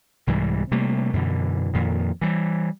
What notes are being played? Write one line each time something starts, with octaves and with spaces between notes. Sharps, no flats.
C2 G#2 E3 G3
C3 G3 A3 A#3
F#2 B2 D3 E3
F2 A#2 D#3
E3 G3